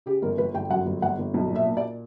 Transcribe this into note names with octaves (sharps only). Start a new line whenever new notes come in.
C#3 G4
G1 A#4
G1 B4
G1 G5
F#2 F#5
G1
G1 F#5
G1
B1
A#2
E5
A#2
D5